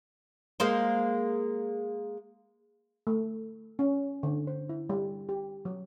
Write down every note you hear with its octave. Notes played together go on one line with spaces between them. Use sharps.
G#3 A#3 C5
A3
C#4
D3
C5
E4
G3
G4
F#3